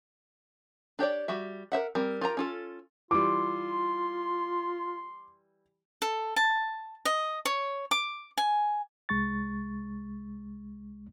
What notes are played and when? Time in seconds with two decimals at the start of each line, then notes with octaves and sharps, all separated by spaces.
0.99 D4 G4 C#5 D5
1.28 G3 F#4 E5
1.72 A#4 C5 E5 F#5
1.95 G3 C4 A#4
2.21 F4 G4 A#4 A#5
2.37 C#4 F4 A4
3.11 E3 G3 F4 C6 D6
6.02 A4
6.36 A5
7.05 D#5
7.45 C#5
7.91 D6
8.38 G#5
9.09 C2 G#3 C#6 A6